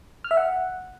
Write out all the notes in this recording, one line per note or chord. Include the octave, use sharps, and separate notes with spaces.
F6
E5
F#5